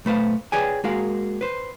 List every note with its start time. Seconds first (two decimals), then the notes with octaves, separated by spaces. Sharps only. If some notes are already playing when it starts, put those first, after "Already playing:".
0.05 B1 A3 B4 C5 F5
0.52 G#4 B4 C#5 D5 G5 G#5
0.84 G#3 A#3 F#4 G#4 A#4 F5
1.41 B4 C5